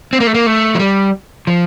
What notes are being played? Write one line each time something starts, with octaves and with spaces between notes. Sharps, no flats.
C4
A#3
A3
A#3
A3
F3
G3
F3